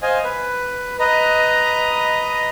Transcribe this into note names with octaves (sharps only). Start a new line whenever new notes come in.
C5 D#5 F5 G#5
B4
B4 D#5 A#5